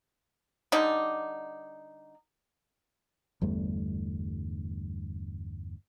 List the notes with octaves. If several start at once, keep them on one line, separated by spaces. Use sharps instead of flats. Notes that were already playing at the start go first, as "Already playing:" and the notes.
D3 G3 D#4
G1 E2 G3 A3